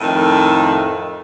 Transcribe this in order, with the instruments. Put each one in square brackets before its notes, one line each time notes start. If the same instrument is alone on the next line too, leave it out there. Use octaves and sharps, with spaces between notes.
[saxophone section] F2 A2 D#3